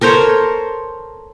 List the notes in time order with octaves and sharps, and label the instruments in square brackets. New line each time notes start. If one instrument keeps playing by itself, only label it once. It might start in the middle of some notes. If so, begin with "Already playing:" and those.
[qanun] A4 A#4 C5 C#5